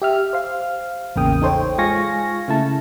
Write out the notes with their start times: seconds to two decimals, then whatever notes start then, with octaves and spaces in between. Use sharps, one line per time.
0.02 G4 E5 F6
0.33 C5 F5
1.16 A1 E2 C#3 A#3 G5 D#6
1.42 D#4 A4 C5 C#5 G5
1.78 G#3 F4 F5 G#5 C#6 A#6
2.48 C#3 A3 E4 A5